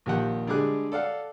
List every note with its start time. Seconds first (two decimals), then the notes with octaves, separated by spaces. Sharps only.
0.06 A#1 D#2 G4 F#5
0.47 D3 G3 G#3 G#4 D6 F#6
0.92 A4 D5 F5 F#5